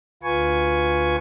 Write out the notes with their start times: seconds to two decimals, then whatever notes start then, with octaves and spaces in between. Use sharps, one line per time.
0.23 D2 F4 B4 G#5 C#6